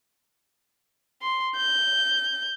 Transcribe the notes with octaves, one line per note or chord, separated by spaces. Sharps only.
C6
G6